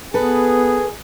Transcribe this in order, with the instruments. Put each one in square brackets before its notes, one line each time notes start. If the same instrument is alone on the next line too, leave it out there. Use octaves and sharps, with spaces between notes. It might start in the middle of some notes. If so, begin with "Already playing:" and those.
[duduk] B3 [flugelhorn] G#4 [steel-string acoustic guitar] A4 B4